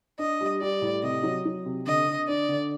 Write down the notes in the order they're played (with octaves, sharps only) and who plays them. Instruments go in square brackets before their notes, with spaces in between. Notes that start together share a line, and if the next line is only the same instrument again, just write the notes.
[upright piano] D4 [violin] D#5
[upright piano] G3
[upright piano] G3 [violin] D5
[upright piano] A2
[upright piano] C3 [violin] D#5
[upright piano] F#3
F#3
C3
[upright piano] D3 [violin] D#5
[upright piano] D3
[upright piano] D4 [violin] D5
[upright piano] D3